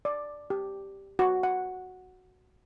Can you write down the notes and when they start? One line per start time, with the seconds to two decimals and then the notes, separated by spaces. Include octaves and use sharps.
0.05 D5
0.50 G4
1.19 F#4
1.43 F#5